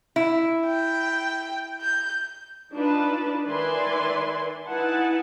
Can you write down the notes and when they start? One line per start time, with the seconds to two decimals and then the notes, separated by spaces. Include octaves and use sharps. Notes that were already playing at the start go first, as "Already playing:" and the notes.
0.16 E4
0.66 G5
1.82 G6
2.73 D4 D#4 F4 B4 A5
3.47 D#3 B4 D5 E5 G#5 C6
4.67 D#4 E4 B4 F#5 G#5 A5